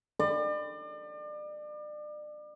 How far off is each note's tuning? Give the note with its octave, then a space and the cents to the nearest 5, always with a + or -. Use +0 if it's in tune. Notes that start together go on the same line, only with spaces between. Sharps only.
D5 +35